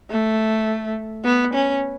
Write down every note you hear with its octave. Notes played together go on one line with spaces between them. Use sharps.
A3
B3
C#4